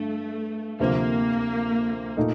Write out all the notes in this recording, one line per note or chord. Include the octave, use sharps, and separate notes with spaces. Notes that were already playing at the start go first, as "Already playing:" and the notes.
Already playing: G2 D3 A3
D2 C3 F3 A#3 C4
A#2 A3 D#4